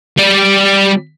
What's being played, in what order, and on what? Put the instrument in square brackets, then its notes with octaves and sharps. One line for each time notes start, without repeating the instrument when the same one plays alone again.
[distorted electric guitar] G3 D5